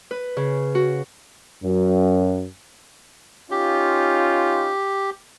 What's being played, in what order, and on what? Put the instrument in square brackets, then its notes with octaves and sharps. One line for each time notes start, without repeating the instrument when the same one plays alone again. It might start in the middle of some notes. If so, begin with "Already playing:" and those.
[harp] B4
C#3
F#4
[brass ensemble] F#2
[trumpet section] C#4 D#4 F4 [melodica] G4